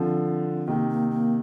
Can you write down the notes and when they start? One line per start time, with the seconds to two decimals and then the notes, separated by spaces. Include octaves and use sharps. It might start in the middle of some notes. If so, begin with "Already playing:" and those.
Already playing: D3 F3 C4
0.67 C3 D#3 A#3
0.89 A#3
1.11 A#3